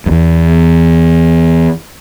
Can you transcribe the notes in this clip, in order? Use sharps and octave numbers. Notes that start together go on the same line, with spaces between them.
F#2
E2